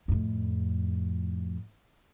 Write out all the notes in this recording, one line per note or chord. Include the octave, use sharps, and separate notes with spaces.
F2 A2